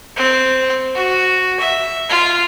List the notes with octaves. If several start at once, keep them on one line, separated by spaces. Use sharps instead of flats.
C4
F#4
E5
F4